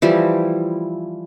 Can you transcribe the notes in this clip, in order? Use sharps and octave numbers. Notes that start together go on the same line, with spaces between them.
E3 F3 G3